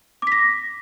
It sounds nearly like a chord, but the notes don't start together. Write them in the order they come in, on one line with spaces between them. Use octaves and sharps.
D6 B6 A#6